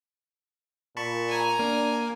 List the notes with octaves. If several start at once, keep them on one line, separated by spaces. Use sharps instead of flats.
A#2 A5 B5 C#6
G#5 A#5
A#3 D4